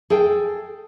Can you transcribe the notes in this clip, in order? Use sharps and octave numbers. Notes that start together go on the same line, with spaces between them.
G#4 A4 G5